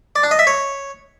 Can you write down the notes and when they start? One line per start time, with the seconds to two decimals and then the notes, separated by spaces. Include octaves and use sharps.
0.16 D5
0.23 D4
0.31 D#5
0.39 E5
0.47 C#5